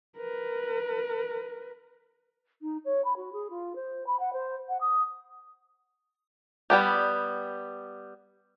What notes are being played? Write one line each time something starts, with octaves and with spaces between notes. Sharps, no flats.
A#4 B4
D#4
C#5
B5
F#4
G#4
F4
C5
B5
F#5
C5
F#5
D#6
G3 B3 G4